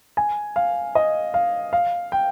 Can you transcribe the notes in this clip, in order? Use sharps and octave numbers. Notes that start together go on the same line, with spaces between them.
G#5
F5
D#5
F5
F5
G5